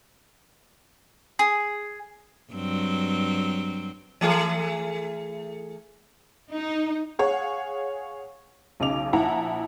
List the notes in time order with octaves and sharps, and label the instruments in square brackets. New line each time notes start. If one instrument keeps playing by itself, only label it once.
[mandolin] G#4
[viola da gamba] G2 F#3 C4
[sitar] E3 A3 G#4
[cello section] D#4
[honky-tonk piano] G#4 C#5 F5 F#5
B1 C#3 D#4 D6 F7
A#1 E4 F#5 A5 A#5